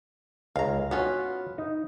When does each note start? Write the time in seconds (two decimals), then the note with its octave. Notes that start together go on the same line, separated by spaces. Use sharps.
0.56 C#2 F5 A#5
0.91 B3 C#4 F4 F#4
1.58 D#4